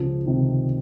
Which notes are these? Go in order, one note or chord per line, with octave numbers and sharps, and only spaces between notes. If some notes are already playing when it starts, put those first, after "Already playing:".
Already playing: C#2 F3
C3 D#3